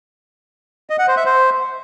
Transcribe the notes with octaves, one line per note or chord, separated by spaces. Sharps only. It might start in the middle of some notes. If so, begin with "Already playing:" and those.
D#5
F#5
C5
E5
C5